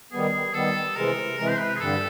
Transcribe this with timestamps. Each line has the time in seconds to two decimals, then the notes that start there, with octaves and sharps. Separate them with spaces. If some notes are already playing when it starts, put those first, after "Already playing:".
0.12 D#3 G3 B3 G#4
0.54 D#3 G3 B3 A4
0.96 C3 E3 G#3 A#4
1.38 C3 E3 G#3 A#4
1.49 C5
1.59 B4
1.75 G#4
1.80 G2 D3 G3 A4